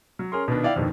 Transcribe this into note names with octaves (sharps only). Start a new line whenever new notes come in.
F#3
C#4 G#4 A#4 C6
B2 D#3 B3 D4
E4 D5 F5 G5
F2 G#2 B2 D3 D#3